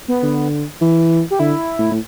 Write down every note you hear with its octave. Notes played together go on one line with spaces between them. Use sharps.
B3
D3
E3
G4
D3 E4
A2
A2